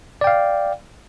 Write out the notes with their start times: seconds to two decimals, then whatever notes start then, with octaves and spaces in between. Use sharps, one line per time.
0.21 D5
0.24 G5
0.27 F5